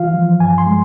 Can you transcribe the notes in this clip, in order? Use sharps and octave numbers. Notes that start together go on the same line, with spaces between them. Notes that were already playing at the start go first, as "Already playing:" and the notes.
Already playing: E3 F4 F5
F3
G2 G#5
C6
G#3